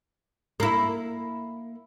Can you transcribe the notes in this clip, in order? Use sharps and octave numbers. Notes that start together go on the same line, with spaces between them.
A#3 E4